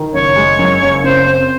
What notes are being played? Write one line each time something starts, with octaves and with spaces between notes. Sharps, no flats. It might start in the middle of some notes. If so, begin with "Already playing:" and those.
Already playing: D#3
F#1 C#5
G#3
F#2
F#1
C#3 C5
C4 C5